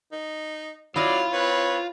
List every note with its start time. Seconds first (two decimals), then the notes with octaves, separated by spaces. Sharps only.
0.12 D#4
0.96 F#3 E4 F4 D5 D#5 F5
1.33 C4 B4 C#5